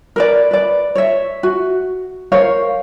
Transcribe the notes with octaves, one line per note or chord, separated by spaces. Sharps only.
A#4 B4 D5
B4 D5
C#5 E5
F#4
A#4 C5 C#5 F5